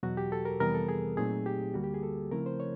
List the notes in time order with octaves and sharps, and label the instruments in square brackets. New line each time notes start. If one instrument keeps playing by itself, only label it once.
[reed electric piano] E2 B2 F#3 F#4
G4
A4
A#4
F2 C3 E3 G3 B3 A#4
A4
G#4
A#2 F#3 A3 C4 D#4 G#4
G4
D2 D3 G3 A#3 F#4
G4
G#4
A4
C#3 F3 A3 C4 E4 A#4
C5
C#5